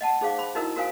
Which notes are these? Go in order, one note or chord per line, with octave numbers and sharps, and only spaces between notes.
D#5 F#5 A5
D#4 G#4 C5 F5 D6
C5 B5
D#4 E4 F#4 A#4 D#5 E6
F#4 A#4 C5 F5 G#5 D#6